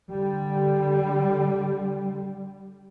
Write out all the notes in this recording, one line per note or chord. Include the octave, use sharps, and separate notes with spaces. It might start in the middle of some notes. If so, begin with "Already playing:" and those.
D3 G3